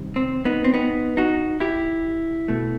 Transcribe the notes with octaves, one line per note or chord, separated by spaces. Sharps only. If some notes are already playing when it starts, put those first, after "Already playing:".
Already playing: C3 D#3 G3
C4
B3 D#4
C4
B3 D#4
D#4 F#4
E4 G4
B2 A3